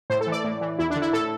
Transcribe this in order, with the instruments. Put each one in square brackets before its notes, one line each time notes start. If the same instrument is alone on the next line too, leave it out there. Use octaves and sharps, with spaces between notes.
[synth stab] A2 C5
A4
E3
D5
A2
E3
E2 E4
D4
D3
E4
A2 A4